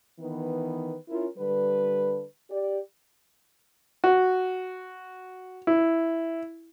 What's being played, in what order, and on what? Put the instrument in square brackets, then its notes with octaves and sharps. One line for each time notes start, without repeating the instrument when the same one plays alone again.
[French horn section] D#3 E3 B3 B4
C#4 E4 F4 A#4
D3 G3 B4
G4 D5
[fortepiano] F#4
E4